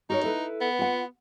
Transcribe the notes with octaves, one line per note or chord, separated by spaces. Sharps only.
D#4 F#4 A#4 C#5
E4 A4 B4
B3
F4 F#5